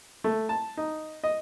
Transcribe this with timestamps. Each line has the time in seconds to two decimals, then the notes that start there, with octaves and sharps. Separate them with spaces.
0.24 A3
0.49 A5
0.77 D#4
1.24 D#5